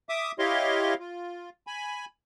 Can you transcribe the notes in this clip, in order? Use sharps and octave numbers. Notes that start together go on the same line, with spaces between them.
E5 D6 D#6
E4 G4 C#5 D#5 F5 C6
F4
G#5 B5